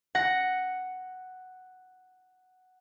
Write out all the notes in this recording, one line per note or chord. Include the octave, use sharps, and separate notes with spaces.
F#5 A#6 C#7